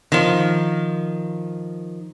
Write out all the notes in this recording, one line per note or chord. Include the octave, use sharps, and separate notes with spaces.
D#3 F3